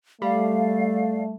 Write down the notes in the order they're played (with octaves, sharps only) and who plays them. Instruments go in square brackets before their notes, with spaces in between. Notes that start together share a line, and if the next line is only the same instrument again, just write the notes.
[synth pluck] G3 [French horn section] A3 [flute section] D5 F5